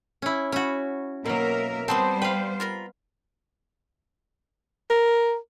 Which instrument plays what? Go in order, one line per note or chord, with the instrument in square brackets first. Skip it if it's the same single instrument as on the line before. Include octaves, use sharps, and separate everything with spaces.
[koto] C#4 E4
[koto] C#4 F#4 [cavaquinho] B5
[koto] B2 F#3 [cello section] A#3 A#4 E5
[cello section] G3 C5 [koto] B3 C4 [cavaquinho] A5 C6 D#6
[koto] B4 F5 [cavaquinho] G5
[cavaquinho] F4 A#4 B5
[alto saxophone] A#4